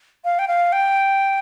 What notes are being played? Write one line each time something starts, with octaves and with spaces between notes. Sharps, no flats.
F5
G5
F5
G5